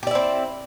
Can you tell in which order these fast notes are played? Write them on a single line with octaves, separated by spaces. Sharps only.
G4 D5 E4 C4